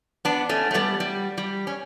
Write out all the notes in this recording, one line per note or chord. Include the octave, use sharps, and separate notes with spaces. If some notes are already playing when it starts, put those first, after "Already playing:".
B3 D4
A3 C#4
A3
G3 B3
G3
G3
C#4